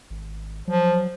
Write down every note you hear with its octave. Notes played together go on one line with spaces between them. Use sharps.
G#1
F3 F#3